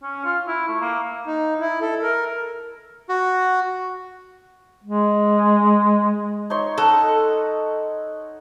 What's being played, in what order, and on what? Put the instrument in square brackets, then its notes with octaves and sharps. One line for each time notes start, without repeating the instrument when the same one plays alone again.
[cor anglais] C#4
F4
E4
A3
A#3
[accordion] D#4
E4
A4
A#4
[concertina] F#4
[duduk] G#3
[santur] D#4 C#5 C6
[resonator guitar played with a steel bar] A4 [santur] D#5 F#5